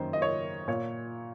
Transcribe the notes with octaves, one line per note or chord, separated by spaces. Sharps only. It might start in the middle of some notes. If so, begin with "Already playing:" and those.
Already playing: F#2 D#3 A#3 C5
D#5
C#5
A#2 C#5